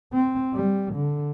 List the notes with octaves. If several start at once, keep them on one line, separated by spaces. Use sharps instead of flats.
C4
G3
D3